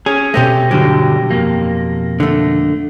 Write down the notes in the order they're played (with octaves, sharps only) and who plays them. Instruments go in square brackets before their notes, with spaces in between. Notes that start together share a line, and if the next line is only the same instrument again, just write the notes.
[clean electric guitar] C#4 [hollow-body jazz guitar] G#4
[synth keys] B2 A#6 [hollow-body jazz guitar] A3 C4 G4
[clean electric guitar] G2 D3 F#3 [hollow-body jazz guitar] G4
[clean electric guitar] F2 A#3
[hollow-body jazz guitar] D3 A3